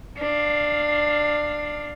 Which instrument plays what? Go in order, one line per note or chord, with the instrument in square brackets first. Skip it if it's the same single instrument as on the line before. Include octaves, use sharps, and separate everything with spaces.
[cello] D4 F5